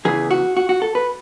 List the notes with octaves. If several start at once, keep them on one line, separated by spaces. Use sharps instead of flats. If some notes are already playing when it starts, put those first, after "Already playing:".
E2 C#3 E3 G#4
F#4
F#4
F#4
A4
B4